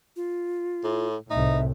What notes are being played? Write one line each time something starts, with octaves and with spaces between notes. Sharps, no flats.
F4
A2
C2 A2 D#4 E5